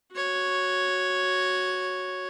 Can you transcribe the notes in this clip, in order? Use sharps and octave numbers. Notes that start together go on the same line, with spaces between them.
F#4 C#5